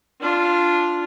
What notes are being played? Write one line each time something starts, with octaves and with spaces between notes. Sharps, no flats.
D4 F4